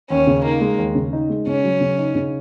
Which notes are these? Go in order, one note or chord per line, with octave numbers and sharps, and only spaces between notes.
D#2 C#4
C#3
A#3 D#4
G#3
D#2
C#3
D#4
G#3
C#3 C#4
F#3
C#3
D#4
C#3